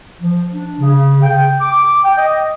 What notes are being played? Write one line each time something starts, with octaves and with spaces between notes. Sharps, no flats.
F3
D4
C#3
G5
D6
G5
D#5